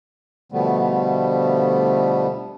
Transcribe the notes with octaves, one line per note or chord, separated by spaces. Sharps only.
B2 D3 F3 G3 A3 B3